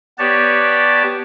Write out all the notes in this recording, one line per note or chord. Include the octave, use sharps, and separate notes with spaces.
B3 G4 B4 C#5 D5 A5